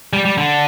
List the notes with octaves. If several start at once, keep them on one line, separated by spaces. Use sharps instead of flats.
G3
G3
D3